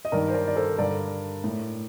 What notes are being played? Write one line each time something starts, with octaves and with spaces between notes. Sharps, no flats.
D#5
G2 D#3 A#4 D5
C5
A#4 D5
D5
A4 C5
G2 D3 A#4 D5
A2